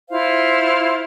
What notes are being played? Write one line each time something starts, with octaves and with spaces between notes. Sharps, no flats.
E4 F4 C5 F5